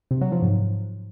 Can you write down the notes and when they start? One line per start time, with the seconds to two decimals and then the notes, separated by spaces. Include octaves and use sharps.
0.11 C3
0.21 F#3
0.32 F3
0.42 G#2